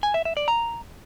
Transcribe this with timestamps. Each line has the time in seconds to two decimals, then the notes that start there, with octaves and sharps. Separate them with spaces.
0.03 G#5
0.14 E5
0.25 E5
0.37 D5
0.48 A#5